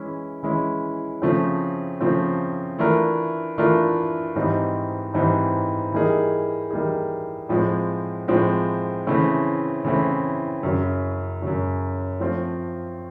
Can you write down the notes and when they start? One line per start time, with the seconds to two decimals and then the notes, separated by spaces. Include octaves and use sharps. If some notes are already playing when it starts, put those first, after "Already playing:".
Already playing: E3 G#3 C#4 E4
0.43 E3 G#3 C#4 E4
1.22 C#3 F3 A3 C4
2.01 C#3 F3 A3 C4
2.79 E3 A3 D4 F4 A#4
3.58 E3 A3 D4 F4 A#4
4.35 G#2 E3 G3 C4 D#4
5.14 G#2 E3 G3 C4 D#4
5.92 E3 G3 A#3 D#4 G#4
6.71 E3 G3 A#3 D#4 G#4
7.49 A2 F3 G#3 C4
8.28 A2 F3 G#3 C4
9.07 C#3 E3 A3 C4 E4
9.84 C#3 E3 A3 C4 E4
10.63 F#2 C#3 F#3
11.42 F#2 C#3 F#3
12.20 F3 A3 C4 F4